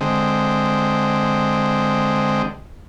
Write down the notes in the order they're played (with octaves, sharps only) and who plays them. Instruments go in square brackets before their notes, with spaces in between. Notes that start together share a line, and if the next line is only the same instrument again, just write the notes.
[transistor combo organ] D3 G#3 C4